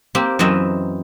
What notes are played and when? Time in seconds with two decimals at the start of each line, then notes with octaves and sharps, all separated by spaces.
0.15 A#3 C4 G4
0.39 F#2 E3 C4 D#5 E5